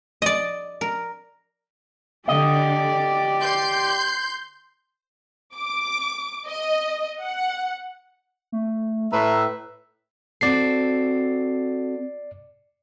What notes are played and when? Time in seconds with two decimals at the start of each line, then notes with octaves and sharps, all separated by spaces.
0.22 D5 D#5
0.81 A#4
2.28 D3 G4 D5 D#5
3.41 C6 G6
5.56 D6
6.48 D#5
7.21 F#5
8.52 A3
9.12 A2 B4 E5 A#5
10.41 C4 F#4 A4 D5 C7